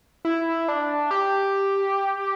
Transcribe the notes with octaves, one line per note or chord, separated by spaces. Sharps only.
E4
D4
G4